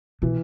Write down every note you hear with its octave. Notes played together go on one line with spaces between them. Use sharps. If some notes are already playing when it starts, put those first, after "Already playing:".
B2 E3